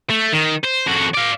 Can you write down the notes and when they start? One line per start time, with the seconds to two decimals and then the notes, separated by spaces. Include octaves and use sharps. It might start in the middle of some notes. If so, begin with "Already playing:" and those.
0.10 A3
0.32 D#3
0.63 C5
0.86 F2 F#4
1.14 D5 F5